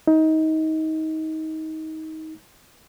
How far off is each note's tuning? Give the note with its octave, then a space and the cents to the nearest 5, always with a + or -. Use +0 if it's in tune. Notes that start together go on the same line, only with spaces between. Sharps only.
D#4 +25